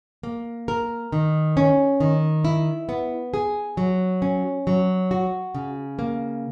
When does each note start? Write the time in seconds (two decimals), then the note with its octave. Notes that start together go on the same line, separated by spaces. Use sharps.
0.23 A#3
0.68 A#4
1.12 D#3
1.57 C#4
2.00 D#3
2.45 E4
2.89 B3
3.34 G#4
3.77 F#3
4.22 C#4
4.67 F#3
5.11 F#4
5.55 C#3
5.99 A#3